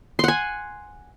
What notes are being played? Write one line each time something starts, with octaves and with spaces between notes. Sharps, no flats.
F#5 G#5 C6